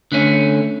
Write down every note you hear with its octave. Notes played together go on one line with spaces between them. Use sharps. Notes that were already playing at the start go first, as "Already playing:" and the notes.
D3 A3 C#4